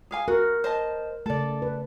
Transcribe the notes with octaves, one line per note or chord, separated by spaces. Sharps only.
G#4 F5 G#5
F#4 A#4
C5 D#5 A5
C#3 A3 A4 D5
B4